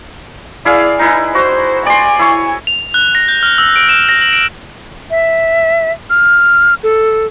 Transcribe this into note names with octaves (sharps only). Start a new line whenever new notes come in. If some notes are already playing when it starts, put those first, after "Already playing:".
E4 G#4 D5 F5
D#4 E4 B4 G#5
F#4 C5
D5 G#5 C6
E4 C#5
F7
F#6
A#6
G6
F6
E6
D7
E7
A#6
F#7
D7
E5
F6
A4